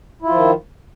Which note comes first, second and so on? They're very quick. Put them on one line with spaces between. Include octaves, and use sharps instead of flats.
E4 F4 F3 D#3